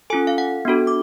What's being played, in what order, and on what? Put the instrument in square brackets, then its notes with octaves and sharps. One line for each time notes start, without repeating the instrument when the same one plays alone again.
[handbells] C#4 F4 A4 G#5
F5
F#5
B3 D4 F#4 A4
D6